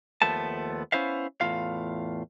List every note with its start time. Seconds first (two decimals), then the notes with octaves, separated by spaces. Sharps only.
0.22 D#2 F3 A3 B3 A5
0.92 B3 C#4 E4 C5 E5 F5
1.41 E2 A2 A3 F4 F5